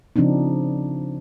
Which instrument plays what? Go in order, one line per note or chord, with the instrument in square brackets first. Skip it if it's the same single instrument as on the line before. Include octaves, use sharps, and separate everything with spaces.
[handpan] C#3 F3 C4 D4 D#4